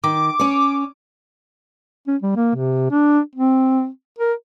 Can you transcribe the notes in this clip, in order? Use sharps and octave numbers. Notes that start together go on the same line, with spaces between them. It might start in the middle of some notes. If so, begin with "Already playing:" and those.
D#3 D6
C#4 C#5
C#4
G3
A#3
C3
D4
C4
A#4